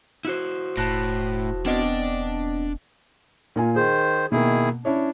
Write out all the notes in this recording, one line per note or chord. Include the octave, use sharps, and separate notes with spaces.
E4 F#4 C5
E1 A2 A5 F#6 A#6
B3 C4 D4 D5 D#5
A#2 F4 G#5
D#3 G#4 C5
B2 D#3 A#3 E4 G#4
C#4 D4 E4 C#5